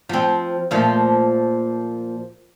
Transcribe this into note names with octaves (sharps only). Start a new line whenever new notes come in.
F3 C4
A#2 F3 A3